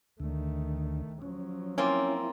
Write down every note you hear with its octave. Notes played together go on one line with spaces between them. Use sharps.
D2 D3 D#3 A3
F3 F#3 C#4
A#3 C4 C#4 E4 F4